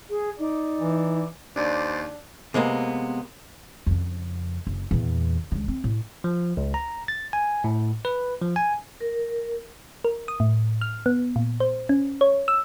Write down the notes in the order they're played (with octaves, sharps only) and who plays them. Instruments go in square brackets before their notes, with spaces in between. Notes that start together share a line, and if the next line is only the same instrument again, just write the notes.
[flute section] G#4
D#4 D5 D6
[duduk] E3
[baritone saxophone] D#2 [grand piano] D4 [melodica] C5 D5
[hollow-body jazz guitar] C3 G#3 A#3 B3
[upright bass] F2 C#3
F#1
E2 A#2
C#2 D3
C4
A2
[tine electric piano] F3
C#2
A#5
A6
G#5
A2
B4
F3
G#5
[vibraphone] A#4
[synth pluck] A#4
D#6
A2
F6
B3
A#2
C5
C#4
C#5
E6